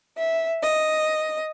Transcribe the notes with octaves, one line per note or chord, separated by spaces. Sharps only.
E5
D#5